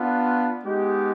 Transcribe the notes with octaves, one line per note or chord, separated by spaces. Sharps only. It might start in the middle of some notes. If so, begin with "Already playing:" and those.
Already playing: B3 D4 F4
G#3 B3 D#4 G4